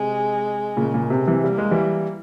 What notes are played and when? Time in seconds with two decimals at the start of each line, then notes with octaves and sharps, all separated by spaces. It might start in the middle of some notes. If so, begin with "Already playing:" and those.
Already playing: C3 G#3
0.77 A#2 C#3
0.94 A#2 C#3
1.10 C3
1.27 C3 E3
1.44 G3 A#3
1.58 G#3
1.71 E3 G3